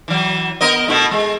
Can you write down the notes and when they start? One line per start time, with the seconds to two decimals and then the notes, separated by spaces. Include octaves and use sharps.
0.08 E3 F#3
0.61 B3 A#4 D#5
0.88 B2 A3 E4
1.11 G#3